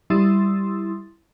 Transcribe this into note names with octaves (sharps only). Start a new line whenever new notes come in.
G3 E4 C6 D#6 E6 A6